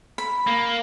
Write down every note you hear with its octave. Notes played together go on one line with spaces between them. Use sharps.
B5
A#3